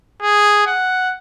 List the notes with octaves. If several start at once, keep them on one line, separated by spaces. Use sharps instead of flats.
G#4
F#5